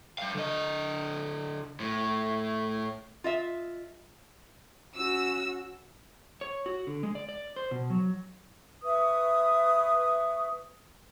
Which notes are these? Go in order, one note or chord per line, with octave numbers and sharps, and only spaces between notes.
G3 F5
D3 D#5
A2
F4 D#5 E5
C#4 F#4 E6
C#5
F#4
D3
G#3
D5
D5
C5
B2
F#3
B4 E5 C#6 D#6